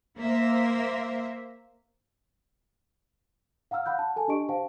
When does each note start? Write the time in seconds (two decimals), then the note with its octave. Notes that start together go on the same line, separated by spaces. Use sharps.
0.17 A#3 C5 E5
3.71 F5 F#5 A#5 E6 F6
3.86 F5 F#5 B5 F#6 G6
3.99 A5
4.16 A4 G#5 A5
4.28 D4 G4 D#5 C#6 D7
4.49 C5 F5 G5 A5